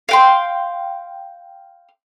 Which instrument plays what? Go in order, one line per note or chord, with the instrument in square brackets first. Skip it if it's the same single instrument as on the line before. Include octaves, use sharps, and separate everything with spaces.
[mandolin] F5 G5 C6